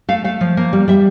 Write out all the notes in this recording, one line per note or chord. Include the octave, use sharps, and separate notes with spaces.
A3 F5
A3 F5
F3
A#3
G3
G3 E5